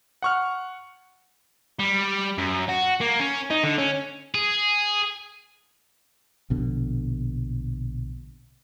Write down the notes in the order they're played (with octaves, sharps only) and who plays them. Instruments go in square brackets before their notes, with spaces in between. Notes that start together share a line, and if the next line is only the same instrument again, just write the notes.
[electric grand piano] F#5 C#6 F6
[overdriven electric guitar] G3
F#2
F#4
A#3
C#4
D#4
D3
C#4
[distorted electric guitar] G#4
[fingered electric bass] A#1 B2 D3